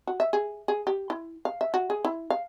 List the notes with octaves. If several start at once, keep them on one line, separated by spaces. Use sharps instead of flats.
F#4
E5
G#4
G#4
G4
E4
F5
E5
F#4
G#4
E4
F5